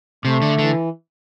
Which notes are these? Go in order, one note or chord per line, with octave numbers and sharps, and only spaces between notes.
C3 A3
D3
D3 E3